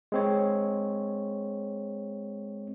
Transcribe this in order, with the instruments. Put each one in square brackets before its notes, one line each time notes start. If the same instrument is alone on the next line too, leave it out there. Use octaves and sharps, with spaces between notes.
[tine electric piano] G#3 C4 C#5